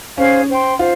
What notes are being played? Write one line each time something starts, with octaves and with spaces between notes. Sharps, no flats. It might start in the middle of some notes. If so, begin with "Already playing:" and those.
C#4 G#4 C5 F5
C5 G5 C6
F4 C5